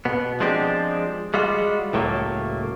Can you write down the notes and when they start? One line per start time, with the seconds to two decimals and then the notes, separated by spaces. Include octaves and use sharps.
0.05 B2 B3
0.40 F3 G#3 C4 D4 G4
1.34 G3 G#3 F4 F#4
1.93 C#2 A2 F#3 A3 A#3